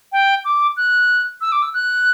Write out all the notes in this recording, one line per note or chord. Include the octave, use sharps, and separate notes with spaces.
G5
D6
F#6
E6
D6
E6
F#6